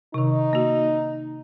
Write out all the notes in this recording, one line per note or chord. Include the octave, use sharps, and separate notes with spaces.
C3 D#3 D#4
A#3 F#4